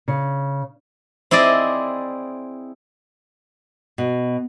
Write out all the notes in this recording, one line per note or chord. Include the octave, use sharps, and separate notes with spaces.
C#3
C4 E4 G#4 D5 D#5
B2